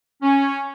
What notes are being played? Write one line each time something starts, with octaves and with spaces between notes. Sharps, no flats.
C#4